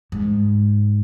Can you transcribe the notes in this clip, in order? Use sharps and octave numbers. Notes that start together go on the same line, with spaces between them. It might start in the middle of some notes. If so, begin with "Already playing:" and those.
G#2